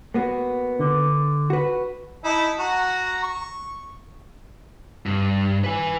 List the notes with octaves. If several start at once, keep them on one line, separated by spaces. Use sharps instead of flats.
A#3 B3 F#4
D3
F#4 B4
D#4 E4 A5
F#4 F#5 A#5
C#6
G2
B4 G#5